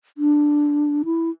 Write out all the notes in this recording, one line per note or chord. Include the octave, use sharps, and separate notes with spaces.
D4
E4